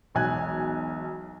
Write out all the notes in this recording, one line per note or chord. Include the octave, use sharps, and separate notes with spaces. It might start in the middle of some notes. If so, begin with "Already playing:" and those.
E1 B1 G#5 F#6 G#6